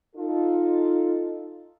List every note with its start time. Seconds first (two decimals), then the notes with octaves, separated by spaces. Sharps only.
0.16 D#4 F4 A4